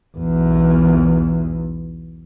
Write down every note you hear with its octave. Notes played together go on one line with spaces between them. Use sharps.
B1 E2